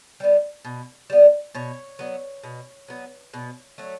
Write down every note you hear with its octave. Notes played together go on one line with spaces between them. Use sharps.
G3 B3
B2
G3 B3
B2 C#5
F#3 B3
B2
F#3 B3
B2
F#3 A3